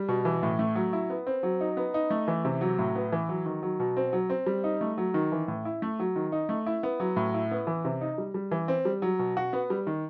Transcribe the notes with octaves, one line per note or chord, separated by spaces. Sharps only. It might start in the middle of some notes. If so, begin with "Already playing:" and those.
Already playing: G3
B2
E3
A2
A3
F#3
E4
B3
C4
F#3
D#4
B3
D#4
A3
E3
C3
F#3
A2
B3
E3
F#3
D#3
F#3
B2
C4
F#3
C4
G3
D#4
A3
F#3
D#3
E3
A2
E4
A3
F#3
D#3
D#4
A3
E4
B3
F#3
A2
E4
B3
E3
C3
D#4
G3
G3
E3
C4
G3
F#3
B2
F#4
B3
G3
D#3